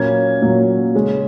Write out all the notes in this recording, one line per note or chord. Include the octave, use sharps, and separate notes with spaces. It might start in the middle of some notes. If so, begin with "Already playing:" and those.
Already playing: A#2 F#3 A#3 C#4 G#6
A#2 F#3 A#3 C#4
C#3 G#3 C#4